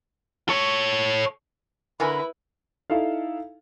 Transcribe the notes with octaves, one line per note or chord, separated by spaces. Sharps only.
A4 C#5
D3 E4 A#4 B4 G#5 B5
D#4 E4 A4 F5